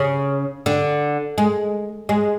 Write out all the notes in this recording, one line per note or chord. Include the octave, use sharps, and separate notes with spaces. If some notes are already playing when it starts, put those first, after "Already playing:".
Already playing: C#3
D3
G#3
G#3